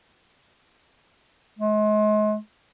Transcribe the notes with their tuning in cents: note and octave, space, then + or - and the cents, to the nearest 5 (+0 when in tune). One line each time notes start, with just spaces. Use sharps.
G#3 +40